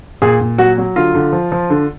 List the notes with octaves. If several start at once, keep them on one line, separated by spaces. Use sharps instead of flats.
A#2 G#4
A#2
F#3 F#4
F#3
D3 F4
D3
F3
F3
D3